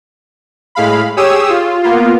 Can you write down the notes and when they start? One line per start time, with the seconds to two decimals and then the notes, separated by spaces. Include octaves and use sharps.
0.75 A2 G#3 F5 B5
1.17 G4 G#4 C#5 D#6 E6
1.50 F4
1.83 A#3 B3 F4